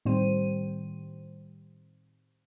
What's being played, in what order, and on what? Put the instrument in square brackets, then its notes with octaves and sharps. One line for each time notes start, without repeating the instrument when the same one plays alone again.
[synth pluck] A2 D#3 G3 C4 C5 D#7